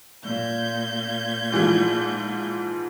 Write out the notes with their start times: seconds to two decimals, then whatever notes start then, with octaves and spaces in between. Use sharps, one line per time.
0.23 A#2 G6 G#6
1.52 G#2 E3 F3